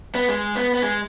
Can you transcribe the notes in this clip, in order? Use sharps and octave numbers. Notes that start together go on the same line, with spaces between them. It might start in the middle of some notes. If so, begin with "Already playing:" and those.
B3
G#3
B3
B3
G#3